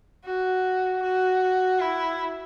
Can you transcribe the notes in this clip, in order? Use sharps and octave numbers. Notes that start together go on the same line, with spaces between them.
F#4
F#4
E4